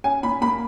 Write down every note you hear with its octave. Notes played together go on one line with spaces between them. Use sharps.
C#4 G#5
A#2 B5
A#3 B5